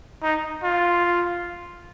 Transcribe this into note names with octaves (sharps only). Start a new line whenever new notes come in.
D#4
F4